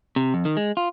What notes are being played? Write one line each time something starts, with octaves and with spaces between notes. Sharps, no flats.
C3
F2
D#3
G#3
F4